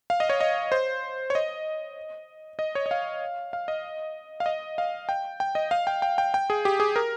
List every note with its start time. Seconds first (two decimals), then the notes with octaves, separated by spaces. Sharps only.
0.10 F5
0.20 D#5
0.30 C#5
0.40 D#5
0.72 C5
1.30 C#5
1.35 D#5
2.59 D#5
2.75 C#5
2.86 D#5
2.91 F5
3.53 F5
3.68 D#5
4.40 F5
4.46 D#5
4.78 F5
5.09 G5
5.40 G5
5.55 D#5
5.71 F5
5.87 G5
6.02 G5
6.18 G5
6.34 G5
6.50 G#4
6.65 G4
6.80 G#4
6.96 A#4